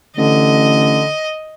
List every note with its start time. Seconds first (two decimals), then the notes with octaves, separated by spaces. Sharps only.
0.17 A1 D3 D#5